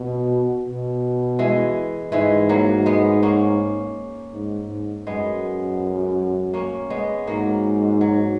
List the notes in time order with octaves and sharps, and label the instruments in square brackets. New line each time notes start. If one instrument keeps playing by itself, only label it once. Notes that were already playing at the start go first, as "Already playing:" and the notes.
Already playing: [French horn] B2
B2
[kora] E3 G#3
[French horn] G#2 [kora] E3 G#3
[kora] F#3 A#3
G#3 B3
A#3 C#4
[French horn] G#2
G#2
[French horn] F#2 [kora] G#3 B3
[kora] A#3 C#4
G#3 B3
[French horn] G#2 [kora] F#3 A#3
[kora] F#3